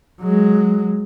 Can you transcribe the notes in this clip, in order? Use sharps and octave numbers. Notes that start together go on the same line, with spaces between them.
F#3 G#3